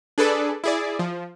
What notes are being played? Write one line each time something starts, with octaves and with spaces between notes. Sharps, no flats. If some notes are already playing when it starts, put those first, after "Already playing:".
D4 G#4 A4 B4 D5
E4 G#4 D5
F3